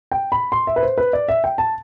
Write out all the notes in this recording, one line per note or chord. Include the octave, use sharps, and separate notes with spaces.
G5
B5
C6
E5
B4
C5
B4
D5
E5
G5
A5